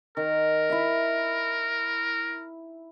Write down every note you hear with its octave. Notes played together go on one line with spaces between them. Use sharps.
D#3 A#4
E4 E5